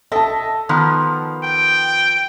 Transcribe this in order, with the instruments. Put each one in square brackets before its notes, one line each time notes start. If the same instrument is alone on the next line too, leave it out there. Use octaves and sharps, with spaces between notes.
[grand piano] A4 A5 [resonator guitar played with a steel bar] D#5 E5
[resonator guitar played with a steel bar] D#3 F3 B3
[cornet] G5